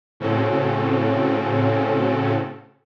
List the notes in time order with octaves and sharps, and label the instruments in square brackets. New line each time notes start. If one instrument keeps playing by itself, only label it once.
[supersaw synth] A2 C#3 C4 C#4 F#4 A4